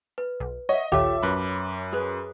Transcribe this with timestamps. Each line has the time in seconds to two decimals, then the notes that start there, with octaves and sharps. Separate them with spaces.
0.18 B4
0.40 B1
0.69 C#5 D#5 E5 F#5
0.92 A#1 D#2 F4 G4 A4 C#5 E5 D6
1.23 F#2 B4 B5
1.92 G#4 B4